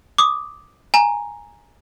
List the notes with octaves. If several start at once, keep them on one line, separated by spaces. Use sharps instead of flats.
D6 D#6
G#5 A#5